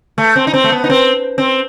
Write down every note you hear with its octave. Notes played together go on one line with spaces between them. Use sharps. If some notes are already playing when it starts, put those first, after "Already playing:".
A3
C4
D#4
C4
A3
B3
D#4
C4
C4